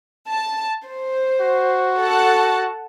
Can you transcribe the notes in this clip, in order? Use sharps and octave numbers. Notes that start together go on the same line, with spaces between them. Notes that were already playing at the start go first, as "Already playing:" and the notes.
A5
C5
F#4
A4 F#5 A5